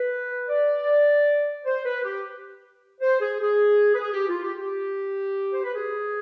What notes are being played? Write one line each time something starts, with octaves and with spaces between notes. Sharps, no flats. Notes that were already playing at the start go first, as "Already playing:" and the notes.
Already playing: B4
D5
C5
B4
G4
C5
G#4
G#4
B4
G#4
G4
F4
G4
G4
C5
B4
G#4